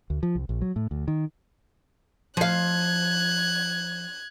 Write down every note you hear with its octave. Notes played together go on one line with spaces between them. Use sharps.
D2
F3
C2
A#1
F#3
A2
D2
D#3
F3 F5 F#6 G#6